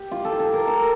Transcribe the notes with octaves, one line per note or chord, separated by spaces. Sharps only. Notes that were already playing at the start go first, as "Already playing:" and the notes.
Already playing: G4
F4
A4
A4
A#4
A4